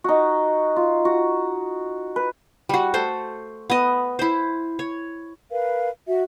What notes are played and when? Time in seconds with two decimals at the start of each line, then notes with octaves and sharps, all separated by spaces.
0.04 D#4 F#4
0.76 F4
1.05 F#4
2.16 B4
2.69 G3 F#4
2.94 A3 A4 C5
3.70 B3 D#5
4.19 E4 C5
4.79 C#5
5.50 A#4 B4 F5
6.07 F#4 E5